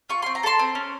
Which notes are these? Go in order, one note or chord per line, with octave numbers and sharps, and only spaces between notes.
F4 C#6
C4 C6
A#5
A4 A5 C6
C4
C#4